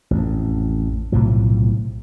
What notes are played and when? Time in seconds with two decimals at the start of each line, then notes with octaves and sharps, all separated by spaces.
0.11 A1 F2
1.12 B1 A2 C3 F3